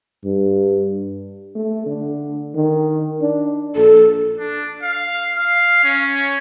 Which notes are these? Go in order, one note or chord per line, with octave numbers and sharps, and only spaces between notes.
G2
A3
D3
D#3
D4
A#1 A4
D4
F5
F5
C#4